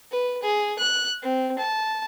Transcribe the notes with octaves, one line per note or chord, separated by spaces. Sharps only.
B4
G#4
F#6
C4
A5